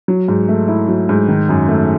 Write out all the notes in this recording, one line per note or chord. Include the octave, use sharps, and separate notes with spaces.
F#3
G#2
A3
E4
F#3
G#2
D#3
F#2
A3